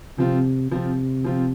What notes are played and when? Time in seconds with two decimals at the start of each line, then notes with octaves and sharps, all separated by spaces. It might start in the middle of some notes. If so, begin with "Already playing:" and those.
0.18 C3 F3 C4 F4
0.71 C3 F3 C4 F4
1.24 F3 C4 F4